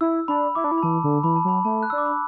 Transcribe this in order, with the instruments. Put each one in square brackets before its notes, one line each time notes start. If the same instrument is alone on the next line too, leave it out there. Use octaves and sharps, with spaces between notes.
[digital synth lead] E4 [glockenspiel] E6
[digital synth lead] D4 [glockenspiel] B5
[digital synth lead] E4 [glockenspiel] D6
[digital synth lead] D4
E4
[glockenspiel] B5
[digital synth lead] E3 [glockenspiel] A5
[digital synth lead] D3
[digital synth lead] E3 [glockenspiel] B5
[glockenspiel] A5
[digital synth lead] F#3 [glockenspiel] B5
[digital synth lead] A3 [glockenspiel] A5
[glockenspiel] F#6
[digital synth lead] D4 [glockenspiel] E6
[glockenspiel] D6
B5